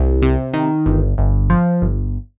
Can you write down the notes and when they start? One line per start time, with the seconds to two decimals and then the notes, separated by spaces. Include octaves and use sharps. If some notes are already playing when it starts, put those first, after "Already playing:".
Already playing: C2
0.22 C3
0.54 D#3
0.86 G1
1.18 G1
1.50 F3
1.82 G1